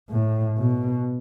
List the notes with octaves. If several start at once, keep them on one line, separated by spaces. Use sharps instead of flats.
A2
B2